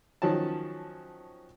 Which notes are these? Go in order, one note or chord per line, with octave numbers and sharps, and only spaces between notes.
D#3 F3 F#3 C#4 A5